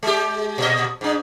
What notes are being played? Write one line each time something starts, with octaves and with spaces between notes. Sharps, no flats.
G#3 G4
A#2 D#5
G#2 D4